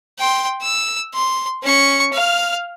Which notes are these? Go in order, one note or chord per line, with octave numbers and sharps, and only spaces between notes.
G5 C6
E6
C6
C#4 C#6
F5 F6